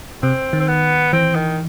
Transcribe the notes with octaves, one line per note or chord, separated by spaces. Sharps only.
C3 C4
D#3
C4
B3
E3 C4
D#3